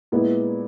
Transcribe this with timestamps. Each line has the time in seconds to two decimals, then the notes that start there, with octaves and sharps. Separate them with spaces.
0.12 A#2 G#3 B3 E4